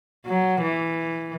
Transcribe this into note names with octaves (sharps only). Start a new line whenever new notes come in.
F#3
E3